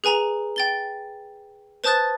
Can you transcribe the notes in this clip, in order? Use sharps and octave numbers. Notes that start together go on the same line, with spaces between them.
G#4 B4 G#5 A#5 F7
G5 A6 G7
B4 C5 A5 D#6 F#6 A6